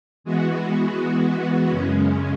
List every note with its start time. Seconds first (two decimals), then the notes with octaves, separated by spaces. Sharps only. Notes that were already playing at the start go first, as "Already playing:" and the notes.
0.24 E3 G#3 B3 F#4
1.68 F#2 C#3 G#3 C#4